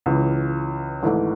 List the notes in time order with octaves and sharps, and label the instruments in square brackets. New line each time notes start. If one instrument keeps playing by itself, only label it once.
[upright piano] C#2 C#3 E3
G#1 G#2 E3 A3